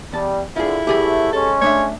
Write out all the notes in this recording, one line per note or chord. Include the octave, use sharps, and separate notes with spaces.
E2 G3 A5
G2 D3 E4 F4 G#4
E2 A3 G4 G#4 B5
G#3 C#4 A4
A3 D4 C#5 E5